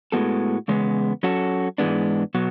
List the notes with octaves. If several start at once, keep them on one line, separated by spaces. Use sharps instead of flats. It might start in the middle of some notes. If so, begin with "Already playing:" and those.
A2 G#3 B3 F#4 A4
E2 C#3 G#3 B3
F#3 C#4 F#4 A4
G#2 E3 G#3 B3 D4
B2 F#3 B3